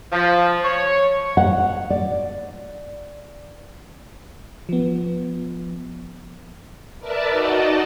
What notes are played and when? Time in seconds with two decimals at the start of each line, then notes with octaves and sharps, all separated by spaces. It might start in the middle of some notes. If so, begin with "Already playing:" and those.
0.12 F3
0.64 C#5
1.37 F#5
1.90 D5
4.69 F3 B3
6.99 A#4 B4 D5 E5 A5
7.28 D#4 F#4 D5 D#5 A5